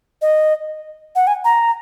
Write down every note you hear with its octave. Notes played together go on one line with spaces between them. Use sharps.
D#5
F#5
G#5
A#5